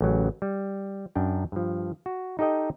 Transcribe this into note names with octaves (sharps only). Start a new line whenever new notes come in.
A1 C#3 F#3
G3
F#2 D4 G5
G2 F3
F#4
D#4 G4 A4 D#5 G5